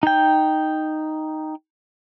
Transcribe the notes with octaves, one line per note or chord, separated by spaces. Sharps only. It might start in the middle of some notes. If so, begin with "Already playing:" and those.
D#4 G5